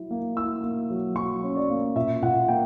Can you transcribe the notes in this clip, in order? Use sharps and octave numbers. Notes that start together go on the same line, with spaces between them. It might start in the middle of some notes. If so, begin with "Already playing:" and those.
Already playing: F#3 E4
A#3
E4 E6
A#3
F#3
F#3 C#6
C#4
D5
A#3
A#2 E5
A#2 F#5
A#3 G5